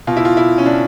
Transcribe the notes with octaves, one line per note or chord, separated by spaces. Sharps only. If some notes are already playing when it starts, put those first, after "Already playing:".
B2 F4
E4
F4
E4
C#4
D4